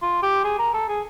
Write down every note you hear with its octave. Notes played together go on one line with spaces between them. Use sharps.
F4
G4
G#4
A#4
A4
G#4